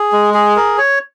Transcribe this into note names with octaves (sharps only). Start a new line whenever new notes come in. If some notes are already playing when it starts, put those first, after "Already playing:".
Already playing: G#4
G#3
G#4
A#4
C#5